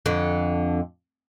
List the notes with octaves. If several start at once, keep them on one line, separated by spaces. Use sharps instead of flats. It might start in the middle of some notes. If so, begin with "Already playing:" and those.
F2 D3